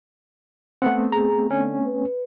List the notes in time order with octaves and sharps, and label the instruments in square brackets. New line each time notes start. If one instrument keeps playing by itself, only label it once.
[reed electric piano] A3 B3 C4 [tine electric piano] F#5
[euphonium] G#4 [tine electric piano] A#5
[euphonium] D3 [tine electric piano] C#4
[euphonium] B4